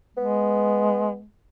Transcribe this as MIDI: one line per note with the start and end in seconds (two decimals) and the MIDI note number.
0.17 1.23 56
0.17 1.16 59